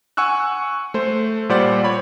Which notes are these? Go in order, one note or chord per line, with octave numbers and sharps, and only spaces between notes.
F#5 G#5 C#6 E6 F#6
A3 C5
A#2 G3 G4 C5 D5 F#5
C#5 B5